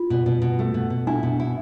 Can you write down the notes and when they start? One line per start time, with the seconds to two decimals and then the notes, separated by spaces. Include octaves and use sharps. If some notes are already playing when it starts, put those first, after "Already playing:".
Already playing: F4
0.10 B2
0.26 B2
0.42 B2
0.59 A3
0.74 B2
0.90 B2
1.07 D4 E4
1.23 B2
1.40 E4